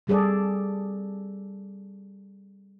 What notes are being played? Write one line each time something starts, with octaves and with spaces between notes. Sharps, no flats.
C3 G3 G#4 A4 D5